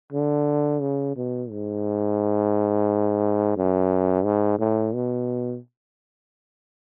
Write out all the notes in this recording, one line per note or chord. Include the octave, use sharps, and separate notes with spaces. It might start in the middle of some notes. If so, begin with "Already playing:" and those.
D3
C#3
B2
G#2
F#2
G#2
A2
B2